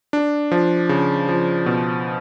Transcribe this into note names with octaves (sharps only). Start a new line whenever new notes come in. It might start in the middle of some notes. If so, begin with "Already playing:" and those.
D4
F3
C#3
F3
B2